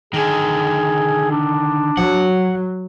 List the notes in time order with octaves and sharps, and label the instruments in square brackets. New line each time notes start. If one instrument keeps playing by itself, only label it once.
[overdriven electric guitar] D3 D#3 [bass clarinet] G#4
[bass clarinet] D4
[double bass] F#3 [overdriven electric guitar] F#5